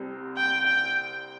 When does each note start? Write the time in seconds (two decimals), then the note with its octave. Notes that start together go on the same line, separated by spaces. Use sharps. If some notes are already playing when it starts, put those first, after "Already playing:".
Already playing: C2 C3 G3 C4
0.37 G5
0.67 G5